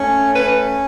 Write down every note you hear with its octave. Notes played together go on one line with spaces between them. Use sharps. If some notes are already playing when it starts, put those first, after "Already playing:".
Already playing: A3 C#4
C#4 B4